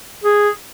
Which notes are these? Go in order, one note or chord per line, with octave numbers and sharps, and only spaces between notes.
G#4